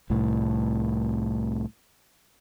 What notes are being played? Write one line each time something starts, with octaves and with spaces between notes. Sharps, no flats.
C2 A2